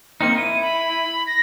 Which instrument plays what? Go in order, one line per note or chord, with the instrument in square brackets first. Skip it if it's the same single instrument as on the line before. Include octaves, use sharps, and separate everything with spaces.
[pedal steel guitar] A#3 C4 D#4 [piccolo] C#7
[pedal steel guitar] E4 [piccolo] D#7
[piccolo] B5
A#6